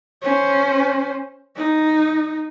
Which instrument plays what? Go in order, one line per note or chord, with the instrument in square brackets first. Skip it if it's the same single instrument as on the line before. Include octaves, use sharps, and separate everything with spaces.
[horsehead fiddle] C#4 C5
D#4